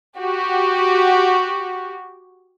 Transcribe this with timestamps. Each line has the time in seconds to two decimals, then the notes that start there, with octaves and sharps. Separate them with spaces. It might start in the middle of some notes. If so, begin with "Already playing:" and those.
0.17 F#4 G4